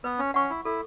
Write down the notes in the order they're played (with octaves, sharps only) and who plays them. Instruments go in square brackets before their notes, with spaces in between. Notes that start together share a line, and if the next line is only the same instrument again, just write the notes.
[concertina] B3 [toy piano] B4
[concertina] C#4
[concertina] C#4 [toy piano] F#5 C#6
[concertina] E4
[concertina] E4 [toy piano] A4